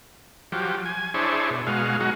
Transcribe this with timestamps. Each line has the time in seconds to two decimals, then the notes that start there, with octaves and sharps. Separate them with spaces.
0.52 F3 F#3 G4
0.85 G#5
1.14 D4 E4 G#4 C5 C#5
1.50 B2
1.67 B2 G#3 F#4 F5
2.00 F#3 G#3 D#4 F#4